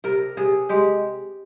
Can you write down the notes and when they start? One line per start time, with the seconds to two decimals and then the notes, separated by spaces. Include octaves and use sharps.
0.04 C3 A#4
0.37 C3 G#4
0.69 G#3 G4